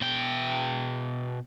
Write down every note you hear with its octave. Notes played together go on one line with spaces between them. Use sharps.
B2 G5